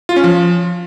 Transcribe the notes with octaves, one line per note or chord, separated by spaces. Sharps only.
F4
C#4
F3